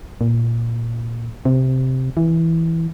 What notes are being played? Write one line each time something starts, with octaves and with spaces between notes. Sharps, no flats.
A#2
C3
E3